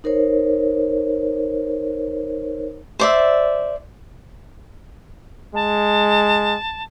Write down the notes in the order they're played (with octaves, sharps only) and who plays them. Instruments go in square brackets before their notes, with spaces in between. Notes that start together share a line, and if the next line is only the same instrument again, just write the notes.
[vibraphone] D#4 A#4 C5 C#5
[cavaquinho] C5 D5 E5
[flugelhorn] G#3 [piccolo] A5